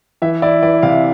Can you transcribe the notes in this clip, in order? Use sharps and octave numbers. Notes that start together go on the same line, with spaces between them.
E3 E5
E4 D5
E3 D5
C3 F5